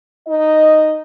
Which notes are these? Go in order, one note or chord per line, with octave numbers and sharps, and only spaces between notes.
D#4 D#5